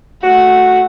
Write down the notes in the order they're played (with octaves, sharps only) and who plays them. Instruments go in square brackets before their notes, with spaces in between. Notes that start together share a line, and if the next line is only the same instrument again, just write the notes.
[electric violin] A3 F#5 [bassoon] F#4